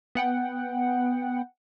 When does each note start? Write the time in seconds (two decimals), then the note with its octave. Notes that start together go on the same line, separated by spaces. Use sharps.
0.15 B3 F#5 G5